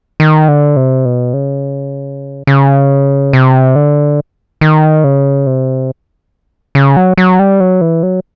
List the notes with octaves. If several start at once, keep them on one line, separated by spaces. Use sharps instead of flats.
D#3
D3
C3
B2
C#3
C#3
C3
D3
D#3
C#3
C3
C#3
F#3
F#3
G3
F#3
E3
F#3